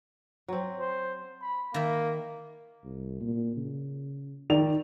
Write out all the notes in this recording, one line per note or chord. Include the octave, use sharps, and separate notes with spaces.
F#3 C4
C5
B5
D#3 A#3 E5
C2
A#2
C#3
D#3 D5 F7